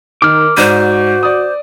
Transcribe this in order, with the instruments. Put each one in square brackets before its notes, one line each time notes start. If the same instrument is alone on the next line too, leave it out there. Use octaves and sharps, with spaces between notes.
[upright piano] D#3 [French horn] A#4 [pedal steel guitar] D6 F6
[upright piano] G#2 D5 D#7 [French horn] F#4 [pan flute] C5
[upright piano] D5 D#6